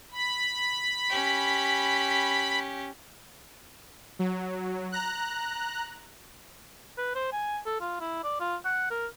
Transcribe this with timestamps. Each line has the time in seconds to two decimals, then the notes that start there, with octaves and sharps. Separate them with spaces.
0.11 B5
1.09 C#4 G4
4.19 F#3
4.92 A#5 F#6
6.98 B4
7.15 C5
7.32 G#5
7.66 A4
7.81 F4
8.00 E4
8.24 D5
8.40 F4
8.65 F#5
8.91 A#4